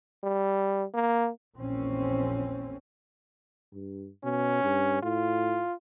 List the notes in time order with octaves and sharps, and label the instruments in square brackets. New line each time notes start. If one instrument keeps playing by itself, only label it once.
[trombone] G3
A#3
[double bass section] A#1 E2 A#2 C4 C#4
[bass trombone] G2
[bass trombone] B2 [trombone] C#4
[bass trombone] G2
[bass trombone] A2 [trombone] F4